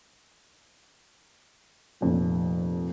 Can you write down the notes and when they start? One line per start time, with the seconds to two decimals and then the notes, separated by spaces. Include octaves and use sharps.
2.01 F1 F2 A#2